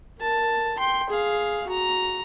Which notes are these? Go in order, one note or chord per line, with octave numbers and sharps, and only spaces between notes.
A#4 A5
G5 C6
G#4 F5
F#4 A#5